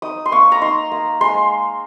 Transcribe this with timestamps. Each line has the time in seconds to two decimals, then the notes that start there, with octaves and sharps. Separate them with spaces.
0.02 D#4 D#6
0.26 C6
0.32 A#3 C#6
0.52 A#5
0.61 D#4 C6
0.92 A#3
1.21 G#3 C6